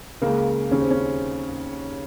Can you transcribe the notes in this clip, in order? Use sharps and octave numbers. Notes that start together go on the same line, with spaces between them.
C#2 C#3 A#3
D#2 C#3 C#4
C4
C#4